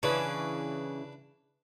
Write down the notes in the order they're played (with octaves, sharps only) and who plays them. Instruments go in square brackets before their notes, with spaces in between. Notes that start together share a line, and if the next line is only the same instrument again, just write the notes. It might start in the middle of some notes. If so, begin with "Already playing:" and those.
[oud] C#3 E3 [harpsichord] D4 B4